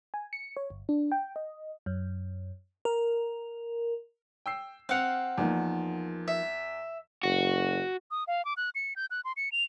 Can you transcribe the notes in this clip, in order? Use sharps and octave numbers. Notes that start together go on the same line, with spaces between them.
G#5
C#7
C#5
G1
D4
G5
D#5
F#2
A#4
G5 E6 C7
C4 F5 F#5 F7
E2 F3 A#3 D#4
E5
F#1 F#4
D#6
F5
D6
F#6
C#7
G6
F#6
C6
C#7
F7